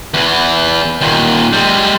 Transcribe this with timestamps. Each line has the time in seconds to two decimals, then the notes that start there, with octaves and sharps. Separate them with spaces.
0.14 E2 E3
1.01 D#2 A#2
1.53 G3 G#3